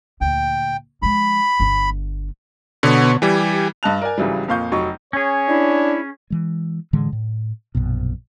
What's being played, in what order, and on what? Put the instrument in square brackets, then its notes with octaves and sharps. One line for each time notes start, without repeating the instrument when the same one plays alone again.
[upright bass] D2 A#2 [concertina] G5
[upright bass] F3 G#3 [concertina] B5
[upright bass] G1 B3
[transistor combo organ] B2 C#5 [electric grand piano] D3 B3
[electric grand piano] E3 G3 [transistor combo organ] G4 G#5
[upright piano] G2 D#5 A5 F#6 F7
A#4 D5 G#5
G#1 C#3 E3 F#3 G3
F2 A#2 F5 C#6 G6
F1 F#3 D#4 C#6
[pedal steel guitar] C#4 G#4 [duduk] C#5
[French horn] D4 [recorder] E4
[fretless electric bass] E3 G#3
A2 D3 E3 G#3
A2
A#1 F#2 B2